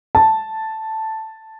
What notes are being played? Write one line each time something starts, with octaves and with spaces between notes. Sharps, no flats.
A5